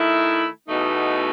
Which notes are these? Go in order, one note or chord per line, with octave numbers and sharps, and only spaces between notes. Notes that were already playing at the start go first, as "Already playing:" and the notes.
Already playing: D#3 A3 E4
E2 B2 A3 D#4